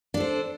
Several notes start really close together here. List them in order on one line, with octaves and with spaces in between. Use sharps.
D4 A4 C5